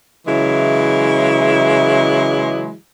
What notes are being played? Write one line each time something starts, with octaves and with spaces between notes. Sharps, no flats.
C#3 E3 F#3 G#3 E4